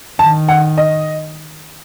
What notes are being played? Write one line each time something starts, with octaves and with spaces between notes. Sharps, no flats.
D#3 A5
F#5
D#5